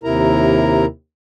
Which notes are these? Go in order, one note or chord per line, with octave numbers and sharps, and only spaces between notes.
D#2 C3 E4 A#4 A#5